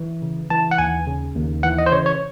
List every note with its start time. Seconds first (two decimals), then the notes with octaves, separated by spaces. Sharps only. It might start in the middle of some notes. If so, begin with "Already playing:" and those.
Already playing: E3
0.22 C#3
0.50 E3 A5
0.71 F#5
0.78 D#2 G#5
1.07 C#3
1.35 D#2
1.63 E3 F#5
1.78 D#5
1.86 C5
1.92 C#3 C#5
2.06 C#5